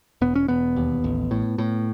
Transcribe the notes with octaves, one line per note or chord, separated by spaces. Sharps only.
E1 B3
C#4
E1 B3
D#2
A1
A2
A2